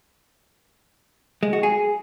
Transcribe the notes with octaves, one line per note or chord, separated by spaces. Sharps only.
G#3
F#4
G#4